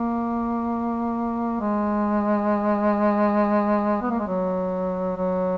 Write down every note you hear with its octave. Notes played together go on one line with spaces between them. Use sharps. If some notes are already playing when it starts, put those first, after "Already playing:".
Already playing: A#3
G#3
B3
A#3
G#3
F#3
F#3